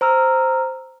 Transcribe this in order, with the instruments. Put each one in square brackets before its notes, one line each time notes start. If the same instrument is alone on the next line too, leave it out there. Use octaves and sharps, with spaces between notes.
[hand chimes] C5 A#5 E6 F6